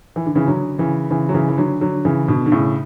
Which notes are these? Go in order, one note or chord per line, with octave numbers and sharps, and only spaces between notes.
E3
D3
C#3 E3
D3 F#3
C#3 E3
C#3 E3
F#3
C#3 E3
E3
D3 F#3
D3 F#3
C#3 E3
B2 D3
D3
A2 C#3